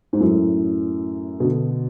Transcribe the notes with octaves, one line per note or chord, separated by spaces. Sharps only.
G#2
F#2 A2
B2 D3